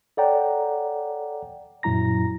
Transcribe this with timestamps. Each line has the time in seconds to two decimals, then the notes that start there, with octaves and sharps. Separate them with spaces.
0.17 A4 C#5 D5 F#5 G5 A#5
1.83 F#2 A#2 F#3 E4 A#5 A#6